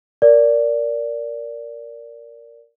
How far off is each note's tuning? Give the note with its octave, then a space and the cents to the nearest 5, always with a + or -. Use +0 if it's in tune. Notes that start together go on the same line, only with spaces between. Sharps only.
A#4 +0 D5 -10